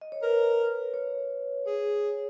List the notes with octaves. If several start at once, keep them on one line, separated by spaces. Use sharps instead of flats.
D#5
C#5
A#4 B4
C#5
G#4 C#5